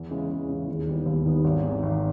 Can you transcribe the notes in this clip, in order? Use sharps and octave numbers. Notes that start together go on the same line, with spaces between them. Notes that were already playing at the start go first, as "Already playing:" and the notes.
Already playing: E2
C#3 G#3 C#4 E4
E2
C#3 G#3 C#4 E4
D#2
D#3 G3 B3
D#2
D#3 G3 B3
G#1
G#2 D#3
G#1